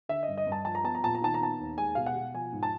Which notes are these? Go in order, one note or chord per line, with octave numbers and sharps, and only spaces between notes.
D3 E5
D#5
G2
D#5
G2
A5
F3 A5
A#5
B3 A5
A#5
A#2 A5
A#5
D#3 A5
A#5
B3 A5
D#2
G#3 G#5
B2 F5
F#5
B2
F3 G#5
G#2
A5